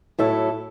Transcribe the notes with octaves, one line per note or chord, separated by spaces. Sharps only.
A2 F#3 A3 E4 A4